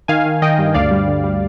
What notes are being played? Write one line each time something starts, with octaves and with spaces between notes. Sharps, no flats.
D#3 F5 G#5
D#3
D#3 D#5 G5
G2
D2 D5 F5
G3
D2
G3